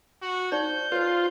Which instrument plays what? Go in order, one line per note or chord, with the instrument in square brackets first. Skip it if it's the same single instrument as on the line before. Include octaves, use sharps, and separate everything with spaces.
[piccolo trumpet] F#4
[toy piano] D#4 C5 D5 [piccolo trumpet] G6
[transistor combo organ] F4 [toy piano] B4 C5